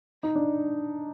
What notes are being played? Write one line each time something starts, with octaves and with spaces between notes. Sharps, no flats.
D#4
D4